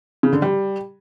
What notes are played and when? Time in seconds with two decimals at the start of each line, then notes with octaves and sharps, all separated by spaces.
0.23 C#3
0.33 D3
0.42 G3